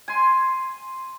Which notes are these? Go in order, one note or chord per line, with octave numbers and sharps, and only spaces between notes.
G#5 C6